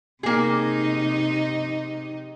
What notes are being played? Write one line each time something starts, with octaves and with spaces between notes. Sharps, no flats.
C3 A#3 D#4 G#4